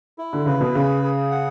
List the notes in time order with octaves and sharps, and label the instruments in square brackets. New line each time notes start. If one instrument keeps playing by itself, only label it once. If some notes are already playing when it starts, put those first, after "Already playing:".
[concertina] E4
[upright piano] D3
[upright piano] C#3 [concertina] B4
[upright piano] B2
[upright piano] C#3 [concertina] G#4
[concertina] G#4
F#5